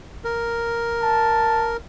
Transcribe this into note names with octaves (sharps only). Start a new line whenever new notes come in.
A#4
A5